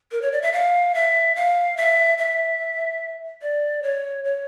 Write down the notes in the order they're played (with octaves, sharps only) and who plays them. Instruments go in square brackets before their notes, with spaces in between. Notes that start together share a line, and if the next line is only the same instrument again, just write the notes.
[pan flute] A#4
C#5
D5
E5
F5
E5
F5
E5
E5
D5
C#5
C#5